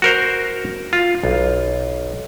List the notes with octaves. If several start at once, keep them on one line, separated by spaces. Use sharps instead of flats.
F#4 A#4 C5
F4
B1